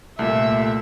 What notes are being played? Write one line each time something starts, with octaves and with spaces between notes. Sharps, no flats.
C2 A#2 A3 E5